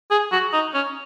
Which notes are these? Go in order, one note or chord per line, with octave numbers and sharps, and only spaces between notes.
G#4
F#4
D#4
C#4